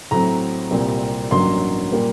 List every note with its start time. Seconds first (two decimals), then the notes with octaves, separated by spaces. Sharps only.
0.11 A2 F#3 C4 A#5
0.71 C2 A#2 G3 C4
1.31 A1 G2 F#3 A#3 C6
1.92 A#2 G3 A#3